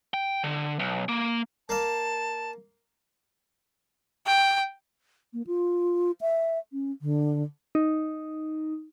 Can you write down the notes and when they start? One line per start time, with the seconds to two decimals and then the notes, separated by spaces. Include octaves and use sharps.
0.14 G5
0.44 D3
0.79 B1
1.09 A#3
1.69 A#3 F5 A5
4.27 G5
5.33 A#3
5.47 F4
6.21 E5
6.73 C#4
7.02 D3
7.75 D#4